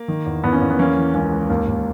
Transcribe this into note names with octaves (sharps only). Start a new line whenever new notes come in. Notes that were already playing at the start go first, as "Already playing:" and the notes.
Already playing: A#3
D#3
E2
E2 B3
A#3 C#4
E2
B3
E3 A#3 C#4
E3
C#2 A#3 C#4
C#2
D#2 A#3
D#2